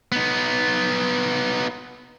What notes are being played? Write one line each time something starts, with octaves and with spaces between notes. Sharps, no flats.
B3 D#4